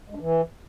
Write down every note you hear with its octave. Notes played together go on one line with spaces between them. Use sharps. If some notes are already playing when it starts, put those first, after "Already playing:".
G#3
D4
E3